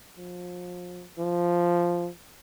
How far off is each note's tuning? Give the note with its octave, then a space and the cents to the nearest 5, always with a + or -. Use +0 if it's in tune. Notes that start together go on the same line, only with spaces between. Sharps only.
F3 +30
F3 -5